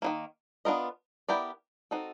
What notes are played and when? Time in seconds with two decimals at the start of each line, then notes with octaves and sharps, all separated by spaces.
0.02 D#3 F#3 A#3
0.65 B3 D4 F4 A#4 D#5
1.29 B3 E4 G4 A#4 D5
1.91 C4 D#4 F#4 A4